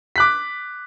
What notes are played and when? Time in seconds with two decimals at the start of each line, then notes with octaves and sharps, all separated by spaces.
0.16 D6 F#6 B6